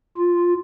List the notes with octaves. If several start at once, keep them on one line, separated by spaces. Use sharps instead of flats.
F4